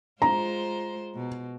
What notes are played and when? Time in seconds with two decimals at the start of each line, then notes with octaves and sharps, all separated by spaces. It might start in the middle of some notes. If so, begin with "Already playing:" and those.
0.22 G#3 F4 C5 A#5
1.15 B2